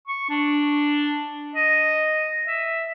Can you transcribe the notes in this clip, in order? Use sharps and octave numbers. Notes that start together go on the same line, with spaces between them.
C#6
D4
D#5
E5